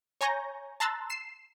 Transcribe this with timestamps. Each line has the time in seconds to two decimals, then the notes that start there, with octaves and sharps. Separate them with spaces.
0.21 C#5 G#5 A#5 C#6 G6 A#6
0.80 A5 A#5 C6 E6 F#6 A6
1.10 C7 E7